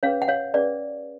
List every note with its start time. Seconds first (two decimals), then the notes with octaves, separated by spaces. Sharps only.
0.03 C#4 G#4 B4 C#5 F5
0.22 F#5
0.28 C#5 F5
0.54 C#4 G#4 B4 D5